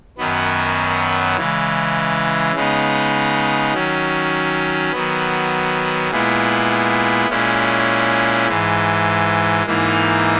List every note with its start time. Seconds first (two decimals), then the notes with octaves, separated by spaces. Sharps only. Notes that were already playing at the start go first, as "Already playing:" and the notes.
0.18 F#2 D#3 F#3 B3
1.37 C#3 E3 G#3
2.55 C#3 G#3 B3 D#4
3.73 D#3 F#3 C#4
4.92 D#3 F#3 B3
6.10 A#2 G#3 B3 E4
7.29 A#2 G#3 C#4 E4
8.48 G#2 E3 G#3
9.66 G#2 E3 A#3 D#4